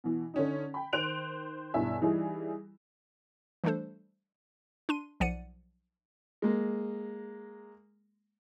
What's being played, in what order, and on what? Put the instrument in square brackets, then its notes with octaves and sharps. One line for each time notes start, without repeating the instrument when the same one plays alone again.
[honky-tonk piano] B2 E3
D3 C#4 D#4
G5 B5
D#3 C5 F#6 D7 F7
B1 G2 E4 E5 G#5
E3 G3 D#4 E4 G#4
[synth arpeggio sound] E3 G3 A3 D4 A4 C5
D4 C6 D#7
B1 F3 D5 F#5 C#7 D#7
[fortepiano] G#3 A#3